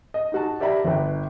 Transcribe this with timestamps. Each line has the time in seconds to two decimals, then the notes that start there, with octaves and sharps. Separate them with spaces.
0.14 D#5
0.32 D#4 F#4 A5
0.60 G4 D5 E5 A#5 B5
0.85 G1 B4 G5